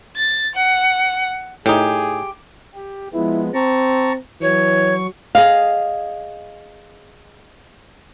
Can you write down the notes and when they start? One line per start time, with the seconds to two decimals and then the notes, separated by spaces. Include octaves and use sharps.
0.16 A6
0.55 F#5
1.66 A2 D#4 G4 G#4
2.75 G4
3.14 F3 G#3 B3 E4
3.54 C4 A5 A#5 C#6
4.41 E3 F#3 C#5 C#6
5.35 G#4 D#5 F5